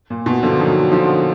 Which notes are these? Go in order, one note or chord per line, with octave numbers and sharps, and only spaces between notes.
A#2
B2
D3 F3
D#3 F#3
D3 F3